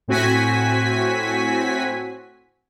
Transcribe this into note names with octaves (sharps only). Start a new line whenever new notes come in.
A2 C4 F#4 G#5 B6